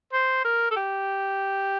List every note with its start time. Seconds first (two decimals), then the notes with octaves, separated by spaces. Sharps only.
0.13 C5
0.45 A#4
0.71 A4
0.76 G4